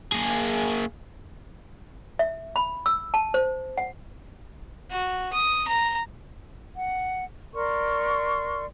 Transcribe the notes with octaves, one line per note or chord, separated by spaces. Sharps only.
A#3 G#4
E5
B5
E6
A5
C5
F#5
F#4
D#6
A#5
F#5
A#4 D5 C6 C#6